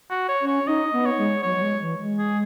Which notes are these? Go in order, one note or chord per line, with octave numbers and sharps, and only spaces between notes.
F#4
C#5
C#4
C#5
D#4 D#5
B3
C#5
G#3
F#3 C#5
F#3
G#3
E3
G#3
G#4